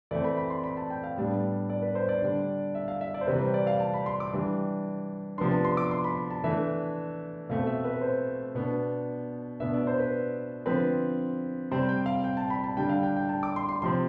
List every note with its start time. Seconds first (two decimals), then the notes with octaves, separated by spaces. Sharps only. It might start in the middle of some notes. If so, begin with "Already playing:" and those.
0.11 E3 A3 C4 D5
0.24 B5
0.37 B5
0.50 C6
0.64 B5
0.77 A5
0.90 G5
1.04 F5
1.16 A2 G3 B3 D4
1.70 D5
1.82 B4
1.95 C5
2.09 D5
2.22 D3 G3 D4
2.75 E5
2.88 F5
3.01 E5
3.14 D5
3.21 C5
3.27 C3 E3 G3 B4
3.41 C5
3.54 D5
3.67 F5
3.80 A5
3.94 B5
4.06 C6
4.20 D6
4.33 E3 G3 D4
5.38 C3 F3 B3 D4 C6
5.51 A5
5.65 C6
5.77 D6
5.91 C6
6.04 B5
6.30 A5
6.44 E3 A3 D4 E5
7.49 B2 A3 C4 F5
7.67 E5
7.84 B4
8.01 C5
8.55 B2 B3 D4
9.60 B2 B3 D4 E5
9.74 D5
9.87 C5
9.99 B4
10.66 D3 F3 C4 B4
11.71 C3 G3 C4 C5
11.89 G5
12.06 F5
12.24 G5
12.37 A5
12.50 B5
12.64 A5
12.77 D3 G3 D4 G5
12.89 F5
13.03 G5
13.16 G5
13.29 A5
13.43 D6
13.56 C6
13.69 C6
13.82 C3 F3 C4 C6